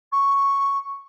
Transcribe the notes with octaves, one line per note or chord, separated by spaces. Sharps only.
C#6